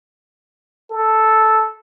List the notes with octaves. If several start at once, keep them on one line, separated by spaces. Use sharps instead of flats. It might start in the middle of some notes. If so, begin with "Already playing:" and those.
A4